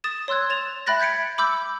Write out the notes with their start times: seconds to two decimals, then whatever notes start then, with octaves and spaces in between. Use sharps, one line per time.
0.04 D#6 A6 E7
0.28 C#5 C6 E6 F#6 G#6
0.50 C#5 A6 E7 F7
0.86 E5 G5 B5 F#6 A6 A#6
1.00 G6 G#6 B6 C#7 D7
1.38 B5 D6 E6 G6